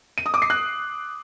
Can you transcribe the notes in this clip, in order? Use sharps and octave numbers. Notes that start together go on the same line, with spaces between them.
D#7
D#6
D6
C7
F#6